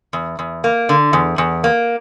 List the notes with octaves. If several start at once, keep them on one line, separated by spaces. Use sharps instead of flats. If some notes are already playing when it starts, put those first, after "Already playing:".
E2
E2
A#3
D3
E2
E2
A#3